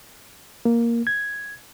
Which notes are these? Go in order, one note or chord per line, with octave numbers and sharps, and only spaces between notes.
A#3
G#6